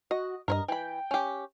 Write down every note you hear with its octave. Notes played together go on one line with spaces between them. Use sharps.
F#4 D#5
G2 A#4 C#5 D#5
E3 G5 B5
C#4 G4